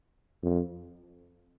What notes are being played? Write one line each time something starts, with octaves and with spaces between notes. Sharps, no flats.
F2